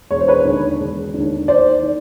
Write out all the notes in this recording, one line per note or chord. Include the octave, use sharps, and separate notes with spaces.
E1 C#5
C5
B4 C#5
D#2 D3
E1
D#2 D3
D#2 C5 D5
D#3